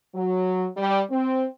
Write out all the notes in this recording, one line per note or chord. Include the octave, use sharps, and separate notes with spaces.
F#3
G3
C4